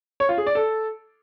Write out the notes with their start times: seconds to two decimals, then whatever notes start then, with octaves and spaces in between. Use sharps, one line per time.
0.20 C#5
0.29 F4
0.38 G#4
0.46 D5
0.55 A4